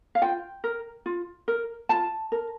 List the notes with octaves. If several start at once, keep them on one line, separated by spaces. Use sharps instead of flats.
F5
F4 G5
A#4
F4
A#4
F4 A5
A#4